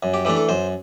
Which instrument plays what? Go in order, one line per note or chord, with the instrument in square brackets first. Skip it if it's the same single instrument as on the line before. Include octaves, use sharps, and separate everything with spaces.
[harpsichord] F#2
G4
E3 A3 D4 G4
A4
F#2 C5